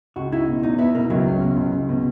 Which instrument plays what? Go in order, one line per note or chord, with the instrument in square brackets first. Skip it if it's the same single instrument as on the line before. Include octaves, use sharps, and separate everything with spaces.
[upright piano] C#2 [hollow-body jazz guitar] F#4
[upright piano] D#4 [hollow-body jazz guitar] E4
[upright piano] B2
[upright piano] E2 [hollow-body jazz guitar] D#4
[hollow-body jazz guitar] B3 [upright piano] E4
[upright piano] B2 [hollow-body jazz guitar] A#3
[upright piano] C#2 [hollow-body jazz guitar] F#3
[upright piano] C#4
B2
C#2
C#2
B2